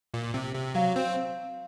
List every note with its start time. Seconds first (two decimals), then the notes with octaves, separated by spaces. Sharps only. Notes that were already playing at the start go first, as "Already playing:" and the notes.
0.14 A#2
0.34 C3
0.55 C3
0.75 F#3 F5
0.96 C4